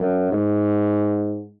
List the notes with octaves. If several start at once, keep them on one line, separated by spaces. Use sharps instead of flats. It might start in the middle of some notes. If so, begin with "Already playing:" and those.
Already playing: F#2
G#2